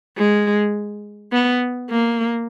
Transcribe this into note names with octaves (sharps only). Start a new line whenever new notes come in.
G#3
B3
A#3